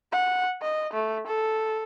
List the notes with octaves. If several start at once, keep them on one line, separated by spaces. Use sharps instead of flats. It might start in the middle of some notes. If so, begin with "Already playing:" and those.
F#5
D#5
A3
A4